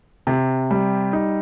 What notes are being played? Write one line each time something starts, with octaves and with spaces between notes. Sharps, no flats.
C3
G3
D#4